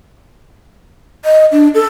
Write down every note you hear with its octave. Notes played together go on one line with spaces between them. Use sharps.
D#5
D4
A4